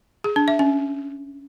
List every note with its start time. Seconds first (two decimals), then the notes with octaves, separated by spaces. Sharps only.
0.24 G#4
0.36 D4
0.48 E5
0.59 C#4